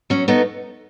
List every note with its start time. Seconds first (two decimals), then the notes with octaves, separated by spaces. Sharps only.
0.10 F#3 C#4
0.28 A3 B3 D#4